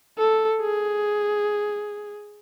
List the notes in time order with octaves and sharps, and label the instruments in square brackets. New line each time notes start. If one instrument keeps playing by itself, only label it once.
[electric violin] A4
G#4